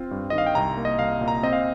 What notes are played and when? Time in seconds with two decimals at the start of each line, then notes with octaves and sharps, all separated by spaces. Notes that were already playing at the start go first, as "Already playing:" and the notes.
Already playing: C4 F4
0.11 G2
0.30 D#3 D#5
0.38 F5
0.46 G5
0.55 C2 A#5
0.78 A#3
0.85 D#5
0.99 C2 F5
1.21 A#2
1.28 A#5
1.43 C4 D#5
1.53 F5